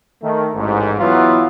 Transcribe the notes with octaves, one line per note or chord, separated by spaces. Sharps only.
D#3 A3
A1 G#2
E3 F#3 B3 E4 F4